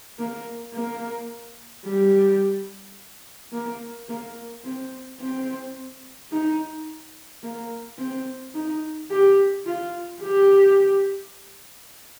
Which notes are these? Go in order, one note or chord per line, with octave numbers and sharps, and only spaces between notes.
A#3
A#3
G3
A#3
A#3
C4
C4
D#4
A#3
C4
D#4
G4
F4
G4